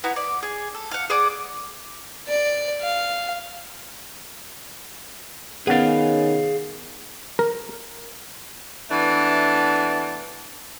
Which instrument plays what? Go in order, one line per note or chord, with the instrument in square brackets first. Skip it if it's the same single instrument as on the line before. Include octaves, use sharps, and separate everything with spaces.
[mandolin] B3 E4 F#4 A#5
D5
G#4
A4
F5 F#5
G#4 D5 F#5 D6
[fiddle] D5
F5
[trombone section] D#3 C#4 [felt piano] B3 F#5 A6 [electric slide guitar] G#4 F5
[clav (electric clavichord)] A#4
[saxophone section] E3 A3 B3 D4